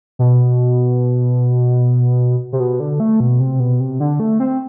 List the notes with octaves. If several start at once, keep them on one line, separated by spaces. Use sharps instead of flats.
B2
C3
B2
D3
A3
B2
C3
B2
C3
D3
A3
C4